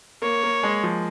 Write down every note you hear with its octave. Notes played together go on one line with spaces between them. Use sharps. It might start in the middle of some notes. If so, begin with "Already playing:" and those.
A#3 C#5
A#3
G#3
F3